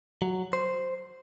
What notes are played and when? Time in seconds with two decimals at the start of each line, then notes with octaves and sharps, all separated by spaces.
0.22 F#3
0.53 C5